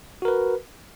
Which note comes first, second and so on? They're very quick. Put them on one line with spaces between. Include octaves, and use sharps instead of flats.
F#4 A#4 B4